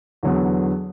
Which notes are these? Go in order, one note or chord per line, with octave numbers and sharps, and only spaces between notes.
E2 D3 F#3 B3